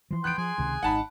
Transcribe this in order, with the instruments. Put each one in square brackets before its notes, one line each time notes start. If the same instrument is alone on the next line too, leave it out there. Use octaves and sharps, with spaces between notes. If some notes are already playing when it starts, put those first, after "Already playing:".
[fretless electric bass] E3 F3 [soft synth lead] C6
[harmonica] B3 G5 [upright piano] F#6 D7
[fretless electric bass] F3 [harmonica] G#4 G#5
[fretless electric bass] C#2 C3 D#3
[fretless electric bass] G#1 [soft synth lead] D#4 [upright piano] F#5 A5 B5